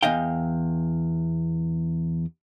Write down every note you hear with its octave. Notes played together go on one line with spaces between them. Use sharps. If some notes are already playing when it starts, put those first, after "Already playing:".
E2 D#5 F5 G5